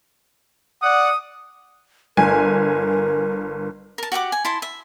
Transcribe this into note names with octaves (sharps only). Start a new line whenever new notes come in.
D5 F#5 D#6
G1 A#4 G#5
A#4 A5
F#4 G4 F#5 D6
G#5
E4 A5 C6
E5